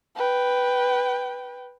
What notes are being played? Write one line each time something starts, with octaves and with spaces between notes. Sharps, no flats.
B4 G5